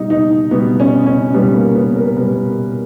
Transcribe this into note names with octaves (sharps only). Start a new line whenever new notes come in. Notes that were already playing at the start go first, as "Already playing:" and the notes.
Already playing: B2 G3 D#4
D#4
B2 G3 B3
C#4
C#4
B2 G3 B3
A#3
B3
A#4
B2 G3 B4